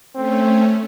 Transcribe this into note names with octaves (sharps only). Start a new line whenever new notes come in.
A3 C4 C#4